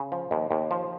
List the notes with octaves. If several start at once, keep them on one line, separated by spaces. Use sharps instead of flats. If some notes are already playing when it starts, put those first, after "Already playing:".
Already playing: C#3
F3
D#2
D#2
F3